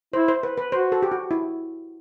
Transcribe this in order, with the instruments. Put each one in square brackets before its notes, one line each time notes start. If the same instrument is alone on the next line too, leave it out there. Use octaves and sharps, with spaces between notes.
[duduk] E4 [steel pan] C5
[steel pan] C5
B4
B4
[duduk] F#4 [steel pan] C5
[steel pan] A4
G4
F#4
E4